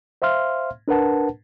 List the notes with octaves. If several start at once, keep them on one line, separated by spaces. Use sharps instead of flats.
C5 E5 F5 C6 F6
D4 A#4 B4 F#5 A5